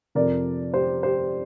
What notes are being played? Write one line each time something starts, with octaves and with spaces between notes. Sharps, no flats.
F2 C3 A#4 D5
G4 C5
G4 C5